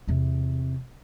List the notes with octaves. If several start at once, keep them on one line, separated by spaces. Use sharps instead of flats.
E2 C3